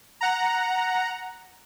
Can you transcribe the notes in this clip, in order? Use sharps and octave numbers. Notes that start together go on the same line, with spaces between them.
F#5 A#5